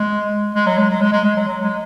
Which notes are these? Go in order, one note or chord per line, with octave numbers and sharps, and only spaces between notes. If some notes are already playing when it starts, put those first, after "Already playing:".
Already playing: G#3
G#3
F#3
G#3
F#3
G#3
G#3
G#3
F#3
F#3
G#3